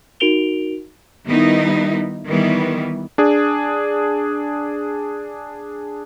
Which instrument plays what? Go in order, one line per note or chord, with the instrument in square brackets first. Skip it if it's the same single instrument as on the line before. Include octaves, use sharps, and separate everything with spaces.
[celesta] D#4 F#4 A#4 D7 F7 G7
[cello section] D#3 G3 B3 D#4 E4
D#3 E3 G3 B3
[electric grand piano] D4 G#4